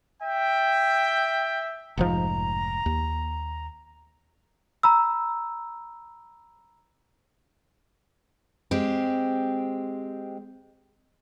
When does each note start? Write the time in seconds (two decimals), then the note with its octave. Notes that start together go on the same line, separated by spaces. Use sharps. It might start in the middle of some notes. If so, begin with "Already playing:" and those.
0.23 E5 G5
1.97 F1 G#2 F3 A#5
2.86 D#2
4.83 A#5 B5 E6
8.71 G#3 C4 G4